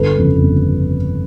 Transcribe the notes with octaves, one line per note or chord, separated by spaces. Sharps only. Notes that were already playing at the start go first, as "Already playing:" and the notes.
Already playing: G1 A4 B4
F2 C#3
G1